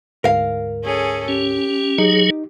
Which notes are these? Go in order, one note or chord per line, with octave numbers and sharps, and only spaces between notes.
D2 G#2 A#4 F5
C#4 G#4 A4
C#4 G4
F#3 D#4 G#4